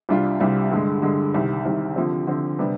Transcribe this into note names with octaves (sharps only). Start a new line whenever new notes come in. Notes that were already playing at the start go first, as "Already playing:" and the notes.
C2 C3 G3 D4 F4
C2 C3 G3 D4 F4
G2 D3 G#3
G2 D3 G#3
C2 C3 D#3
C2 C3 D#3
D3 F3 C4
D3 F3 C4
C3 G3 B3 D4